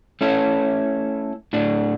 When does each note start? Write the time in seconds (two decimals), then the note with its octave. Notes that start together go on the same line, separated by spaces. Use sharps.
0.21 A3 C#4 E4 A4
1.53 A2 A3 D4